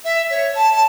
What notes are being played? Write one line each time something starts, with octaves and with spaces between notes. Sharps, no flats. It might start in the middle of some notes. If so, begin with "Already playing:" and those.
E5
C#5
A5
A5